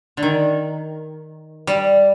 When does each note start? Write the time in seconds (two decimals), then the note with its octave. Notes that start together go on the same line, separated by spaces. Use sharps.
0.17 D3
0.23 D#3
1.67 G3